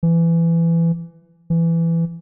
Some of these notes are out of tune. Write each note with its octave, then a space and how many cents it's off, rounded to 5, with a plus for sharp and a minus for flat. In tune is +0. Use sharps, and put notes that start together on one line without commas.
E3 +20
E3 +15